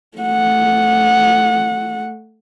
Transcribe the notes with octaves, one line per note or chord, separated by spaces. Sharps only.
A3 F#5